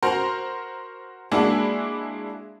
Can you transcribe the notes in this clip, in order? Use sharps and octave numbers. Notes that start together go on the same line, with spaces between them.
F#4 A#4 C5 A#5
G#3 A#3 D4 E4 F#4 G#4